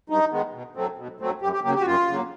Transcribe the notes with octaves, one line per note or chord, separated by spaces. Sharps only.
G2 D#4
D#3 G#3 B3
B2
F#3 A3 C4
B2
F#3 A3 C4
F#2 G4
G4
C#3 F#3 A#3 G4
G4
F#4
F#2 F4
C#3 F#3 A#3